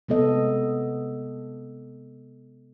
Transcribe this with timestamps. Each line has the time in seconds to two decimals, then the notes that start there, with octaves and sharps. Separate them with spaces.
0.08 C3 G#3 B3 A4 D#5